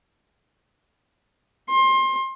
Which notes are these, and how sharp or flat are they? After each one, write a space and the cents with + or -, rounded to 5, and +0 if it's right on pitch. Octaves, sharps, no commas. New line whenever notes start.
C6 +25